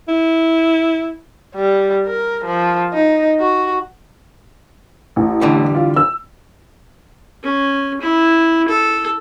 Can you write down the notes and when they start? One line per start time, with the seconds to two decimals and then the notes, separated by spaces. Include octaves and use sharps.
0.08 E4
1.55 G3
2.07 A#4
2.45 F3
2.94 D#4
3.40 F#4
5.16 A1
5.41 D3 E3 G3
5.75 F4
5.96 E6
7.43 C#4
8.01 E4
8.68 A4